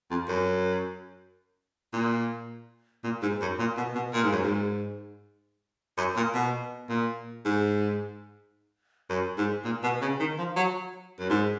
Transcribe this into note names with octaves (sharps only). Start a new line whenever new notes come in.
F2
F#2
A#2
A#2
G#2
F#2
A#2
B2
B2
A#2
G#2
F#2
G#2
F#2
A#2
B2
A#2
G#2
F#2
G#2
A#2
B2
C#3
D#3
F3
F#3
F#2
G#2